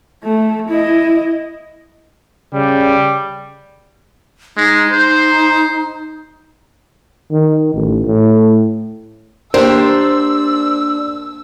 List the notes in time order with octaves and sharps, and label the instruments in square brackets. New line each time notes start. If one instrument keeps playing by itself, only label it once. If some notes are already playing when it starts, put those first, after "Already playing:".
[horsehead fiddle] A3
E4 D#5
[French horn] C#3 [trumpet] G3
[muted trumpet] G#3 [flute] D#4
[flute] D#4 [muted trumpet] C5
[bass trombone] D#3
A1
A2
[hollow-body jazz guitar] A#3 G4 A#4 [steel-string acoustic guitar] D4 [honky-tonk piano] C5 [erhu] E6